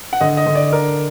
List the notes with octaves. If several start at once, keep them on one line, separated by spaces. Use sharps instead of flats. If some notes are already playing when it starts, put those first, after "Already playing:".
F#5
D3 D#5
D#5
D3
D5
D4 A#4